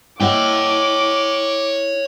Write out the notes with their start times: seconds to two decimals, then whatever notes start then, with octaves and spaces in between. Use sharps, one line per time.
0.20 E4 C#5 D#5 F#5 G5 D6